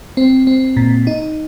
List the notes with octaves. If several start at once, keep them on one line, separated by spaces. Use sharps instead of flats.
C4
C4
A#2
D#4